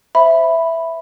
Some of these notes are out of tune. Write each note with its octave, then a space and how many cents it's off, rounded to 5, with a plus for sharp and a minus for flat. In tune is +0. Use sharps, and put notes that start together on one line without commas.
C5 +0 E5 +0 B5 +0